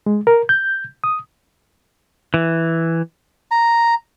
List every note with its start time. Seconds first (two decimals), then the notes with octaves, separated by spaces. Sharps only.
0.06 G#3
0.27 A#4
0.49 G6
1.04 D#6
2.34 E3
3.51 A#5